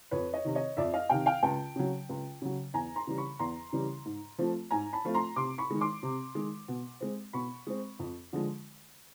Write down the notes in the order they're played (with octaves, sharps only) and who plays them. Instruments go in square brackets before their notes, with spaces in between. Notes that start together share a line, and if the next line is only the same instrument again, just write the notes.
[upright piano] F2 B4 C#5
C#5 D#5
C3 D#3
C#5 D#5
F2 D5 E5
D#5 F5
C3 D#3 F5 G5
F5 G5
C#2 G5 A5
C#3 F#3
C#2
C#3 F#3
E2 G#5 A#5
A#5 C6
C#3 E3 G3
B5 C#6
E2 A#5 C6
C#3 E3 G3
G#2
F3 A3 C4 F4
G#2 G#5 A#5
A5 B5
F3 A3 C4 F4
A#5 C6
C3 C6 D6
B5 C#6
D#3 G#3
C6 D6
C3
D#3 G#3
B2
G#3 C4
B2 B5 C#6
G#3 C4
F2
D3 F3 G#3